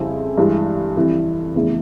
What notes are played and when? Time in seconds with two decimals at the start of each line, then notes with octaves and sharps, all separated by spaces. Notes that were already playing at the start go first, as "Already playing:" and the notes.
Already playing: F2 C#3 G3 C4 E4
0.38 G2 E3 G#3
0.96 F2 E3 G3
1.55 F1 E2 C#3 E3